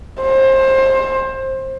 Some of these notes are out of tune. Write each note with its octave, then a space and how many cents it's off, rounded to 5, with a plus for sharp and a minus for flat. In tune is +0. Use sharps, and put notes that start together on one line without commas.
C5 +25